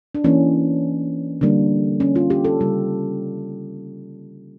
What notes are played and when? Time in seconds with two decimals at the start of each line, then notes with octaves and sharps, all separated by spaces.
0.15 D4
0.24 E3 A#3 C#4
1.41 D3 G3 A#3
2.00 C#4
2.16 F4
2.30 G4
2.45 A4
2.59 C#3 G3 A#3